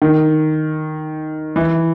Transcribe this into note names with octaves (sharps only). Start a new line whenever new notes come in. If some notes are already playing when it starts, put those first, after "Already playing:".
D#3
E3